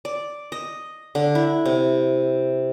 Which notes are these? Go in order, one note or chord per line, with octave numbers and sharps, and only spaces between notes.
D5
D#5
D3
E4
C3